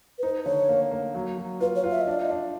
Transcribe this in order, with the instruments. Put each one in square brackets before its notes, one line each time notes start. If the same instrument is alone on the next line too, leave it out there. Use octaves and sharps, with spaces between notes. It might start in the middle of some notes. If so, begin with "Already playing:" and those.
[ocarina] B4
[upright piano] D#4 [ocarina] C5
[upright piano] D3 [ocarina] C#5
[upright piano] A#3
A#3
F#3
F#3
[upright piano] F4 [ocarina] B4
[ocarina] C#5
[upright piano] F4
[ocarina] E5
D#5
[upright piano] D4 [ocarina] D5
[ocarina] D#5
[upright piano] D4